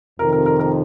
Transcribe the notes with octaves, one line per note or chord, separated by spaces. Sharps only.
F2 C3 D#3 A#4
A#4
A#4
A#4